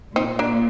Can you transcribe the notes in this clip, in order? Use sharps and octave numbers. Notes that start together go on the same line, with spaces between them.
A#2 C4 D#4
A#3 D4